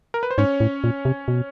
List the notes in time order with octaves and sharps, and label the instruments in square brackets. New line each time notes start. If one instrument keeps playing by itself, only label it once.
[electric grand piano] A#4
B4
C5
[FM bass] G#2 [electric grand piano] C#4 C#5
[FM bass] A2
A#2
C3
B2